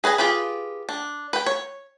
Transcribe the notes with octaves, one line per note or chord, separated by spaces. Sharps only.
G#4 B4 D#5 G#5
F4 G4 G#4 B4
D4
B4 G5
C#5